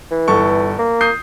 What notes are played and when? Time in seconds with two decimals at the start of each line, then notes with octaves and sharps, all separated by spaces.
0.11 E3
0.28 G1 A4 C#6
0.79 A#3
1.01 D#6 G6 C7